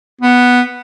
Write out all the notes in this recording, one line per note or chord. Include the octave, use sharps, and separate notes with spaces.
B3